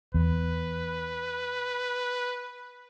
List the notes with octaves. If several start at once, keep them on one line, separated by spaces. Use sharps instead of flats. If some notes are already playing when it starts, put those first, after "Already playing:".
E2 B4